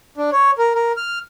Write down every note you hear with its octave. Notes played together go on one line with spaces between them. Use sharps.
D4
C#5
A#4
A#4
F6